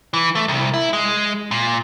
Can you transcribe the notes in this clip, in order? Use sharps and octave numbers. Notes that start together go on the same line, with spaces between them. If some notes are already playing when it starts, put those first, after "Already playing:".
E3
A3
C2
E4
G#3
A#2